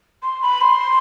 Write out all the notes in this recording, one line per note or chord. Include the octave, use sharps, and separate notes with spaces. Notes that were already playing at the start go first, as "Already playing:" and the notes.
C6
B5
C6